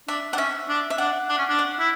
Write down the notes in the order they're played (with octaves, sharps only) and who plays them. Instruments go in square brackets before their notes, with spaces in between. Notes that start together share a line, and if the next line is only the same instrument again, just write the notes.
[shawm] D4 [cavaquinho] E5
[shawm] D4 [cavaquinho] F#5
[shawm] C#4 [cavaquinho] E5
[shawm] D4
[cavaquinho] E5
[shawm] D4 [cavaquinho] F#5
[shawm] D4
C#4
D4
[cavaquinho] F#5
[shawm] E4